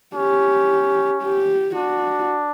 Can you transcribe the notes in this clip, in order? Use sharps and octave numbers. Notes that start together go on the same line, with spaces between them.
C#4 G4
G4
D4 F#4